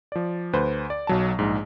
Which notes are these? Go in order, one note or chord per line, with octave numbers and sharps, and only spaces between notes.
F3 D5
D2 B4 C5
D5
B1 F#3 A5
A#1 G#2